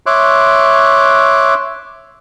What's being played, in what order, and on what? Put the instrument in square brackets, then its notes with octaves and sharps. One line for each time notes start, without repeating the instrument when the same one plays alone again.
[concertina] C#5 E5 C6 D6 F#6